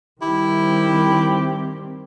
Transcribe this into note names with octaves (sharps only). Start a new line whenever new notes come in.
D#3 G3 C4 E4 G4